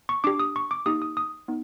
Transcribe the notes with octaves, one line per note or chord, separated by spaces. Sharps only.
C#6
D4 G4 D6
D#6
C#6
D6
A#3 D#4 G4 D#6
D#6
D#6
B3 D#4